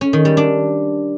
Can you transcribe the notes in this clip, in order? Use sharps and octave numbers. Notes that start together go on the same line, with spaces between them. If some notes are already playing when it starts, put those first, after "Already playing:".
C#4
D#3
G3
D4